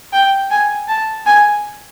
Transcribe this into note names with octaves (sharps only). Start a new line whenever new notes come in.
G5
G#5
A5
G#5